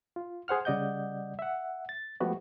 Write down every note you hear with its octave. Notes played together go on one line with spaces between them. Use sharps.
F4
G#4 C5 F#5 F6
C#3 G3 D5 D#5 F#5 G6
E5 F#5
A6
F3 G#3 A3 B3 F#4 G4